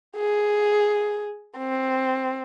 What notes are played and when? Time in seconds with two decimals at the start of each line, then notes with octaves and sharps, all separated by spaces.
0.16 G#4
1.58 C4